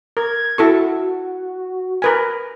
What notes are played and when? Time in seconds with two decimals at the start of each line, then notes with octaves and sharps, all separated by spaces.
0.17 A#4 G#6
0.58 E4 F#4 A4 C#6
2.02 A#4 B4 G#5